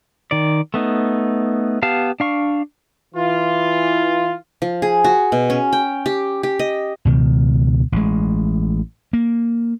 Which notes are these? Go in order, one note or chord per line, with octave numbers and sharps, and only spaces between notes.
D#3 D5
A3 B3 D#4
B3 G4 F5 A5
D4 F5 C#6
E3 F4
F3
G#4
F#4
B2
C#4
G5
G4
G4
D#5
C#2 B2 D#3
A1 G#3
A#3